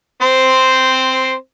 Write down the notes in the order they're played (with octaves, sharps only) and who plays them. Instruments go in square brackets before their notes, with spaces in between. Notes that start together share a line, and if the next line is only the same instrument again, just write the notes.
[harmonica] C4 C5